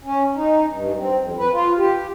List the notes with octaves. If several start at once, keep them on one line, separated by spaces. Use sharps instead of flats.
C#4
D#4
G2
C4
F2
B4
F4
G4